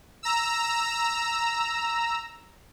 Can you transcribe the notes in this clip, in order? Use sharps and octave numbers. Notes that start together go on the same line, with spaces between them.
A#5 E6